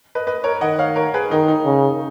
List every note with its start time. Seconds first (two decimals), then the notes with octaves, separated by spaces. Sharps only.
0.15 B4 D#5
0.27 B4 D#5
0.44 A#4 C#5
0.61 D#3 D#5 F#5
0.78 C#5 F5
0.96 A#4 C#5
1.14 G#4 B4
1.31 D#3 D#4
1.48 D#4
1.65 C#3